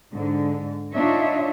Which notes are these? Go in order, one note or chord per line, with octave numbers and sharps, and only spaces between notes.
G#2 D3
D4 D#4 F4 C#5 D#5 E5